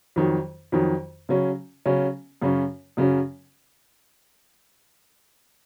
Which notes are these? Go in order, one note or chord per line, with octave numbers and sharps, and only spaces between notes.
F2 D#3 F#3
F2 D#3 F#3
C#3 F#3 C#4
C#3 F#3 C#4
F#2 C#3 F#3 C#4
F#2 C#3 F#3 C#4